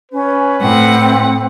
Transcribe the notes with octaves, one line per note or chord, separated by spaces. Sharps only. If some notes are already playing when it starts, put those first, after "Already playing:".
C#4 B4
A2 C4 F#5